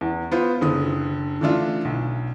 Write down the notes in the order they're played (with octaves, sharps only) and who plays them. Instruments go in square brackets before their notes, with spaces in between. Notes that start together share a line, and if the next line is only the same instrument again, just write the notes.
[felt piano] E2
B3 F4 C5
F#1 D3 D#6
D3 E3 A3 D4 F4
B1